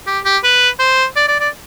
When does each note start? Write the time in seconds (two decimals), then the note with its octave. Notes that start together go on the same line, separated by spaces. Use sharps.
0.07 G4
0.25 G4
0.44 B4
0.79 C5
1.16 D5
1.28 D5
1.40 D5